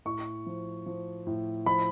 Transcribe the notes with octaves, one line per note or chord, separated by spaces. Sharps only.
A2 C#6
F3
F3
A2
F3 B5